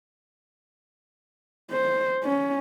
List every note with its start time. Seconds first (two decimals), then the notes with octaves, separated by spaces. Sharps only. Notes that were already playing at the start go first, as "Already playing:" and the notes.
1.71 C5
2.24 C#4